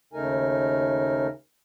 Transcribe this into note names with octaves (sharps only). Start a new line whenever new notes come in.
D#2 C#3 A3 D#4 A#4 G#5